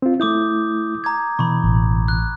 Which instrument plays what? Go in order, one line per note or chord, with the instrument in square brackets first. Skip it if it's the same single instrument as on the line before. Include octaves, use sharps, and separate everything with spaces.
[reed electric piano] C4 F4
[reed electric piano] A3 E4 [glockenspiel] D6 D#6 G6
[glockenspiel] A#5 D6 G#6
[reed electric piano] B2 E3 [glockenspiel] B5 C#6
[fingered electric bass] A1
[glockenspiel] F#6